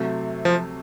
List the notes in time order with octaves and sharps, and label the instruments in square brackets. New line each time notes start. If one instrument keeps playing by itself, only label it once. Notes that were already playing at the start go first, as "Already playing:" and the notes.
Already playing: [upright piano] C3 F#3 A3
[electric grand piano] F3